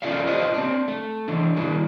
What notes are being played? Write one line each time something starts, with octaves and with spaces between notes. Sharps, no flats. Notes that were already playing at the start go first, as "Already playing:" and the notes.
C#4 F4 A4 D5 E5 F5
F4 G4 B4 C5 D#5
C4 D4
A3
E3 D4
D#3 G3 E4 F#4